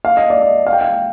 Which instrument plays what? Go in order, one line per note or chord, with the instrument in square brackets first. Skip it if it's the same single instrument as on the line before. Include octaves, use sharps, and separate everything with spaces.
[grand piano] F5
D#5
D5
D#5
F5
G5
F5